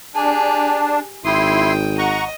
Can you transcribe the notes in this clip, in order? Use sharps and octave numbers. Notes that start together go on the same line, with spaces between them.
D4 G4 G#4
G#1 E4 G5 C6 D#6
D#5 F#5 A#5 C#6